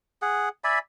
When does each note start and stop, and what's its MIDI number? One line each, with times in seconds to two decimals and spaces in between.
0.22 0.49 68
0.22 0.49 78
0.64 0.79 74
0.64 0.79 76
0.64 0.79 80
0.64 0.79 83